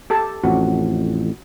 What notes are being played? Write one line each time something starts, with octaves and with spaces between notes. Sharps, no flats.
G4 A4 A5
A1 F2 C#4 F#4